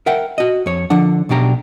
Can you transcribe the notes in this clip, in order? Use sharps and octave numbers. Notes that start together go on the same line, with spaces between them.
A#4 E5 F#5 G5
F#4 D#5
F2 C#5
D3 F3 D4 F#5
B1 B2 D4 G4 A#5